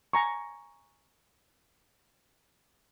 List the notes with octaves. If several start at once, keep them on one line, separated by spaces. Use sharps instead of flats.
G#5 A#5 C#6